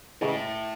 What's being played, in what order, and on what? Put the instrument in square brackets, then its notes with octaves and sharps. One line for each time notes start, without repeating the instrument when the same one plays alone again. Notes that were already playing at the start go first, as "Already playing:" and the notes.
[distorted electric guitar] A2 [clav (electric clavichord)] C#3 E3 G#3